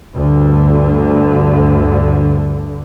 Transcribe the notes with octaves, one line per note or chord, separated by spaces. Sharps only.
D2 G2 D3